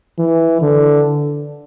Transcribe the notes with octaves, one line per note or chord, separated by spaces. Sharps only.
E3
D3